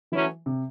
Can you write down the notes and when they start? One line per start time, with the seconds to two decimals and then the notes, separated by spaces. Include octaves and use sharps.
0.12 E3 F#3 A3 C#4 E4
0.46 C3